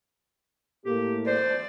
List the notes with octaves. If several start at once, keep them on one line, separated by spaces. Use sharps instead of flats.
A2 A3 A#3 G4
C5 D5